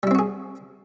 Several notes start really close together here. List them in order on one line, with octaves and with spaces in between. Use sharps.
G3 E4 C4 F#4 G#4